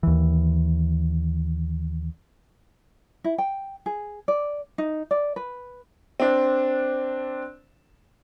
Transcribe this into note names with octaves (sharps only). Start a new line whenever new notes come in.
D#2 E3
E4
G5
G#4
D5
D#4
D5
B4
C4 D4